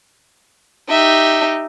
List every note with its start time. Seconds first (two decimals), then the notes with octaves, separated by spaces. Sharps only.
0.89 D#4 G4 E5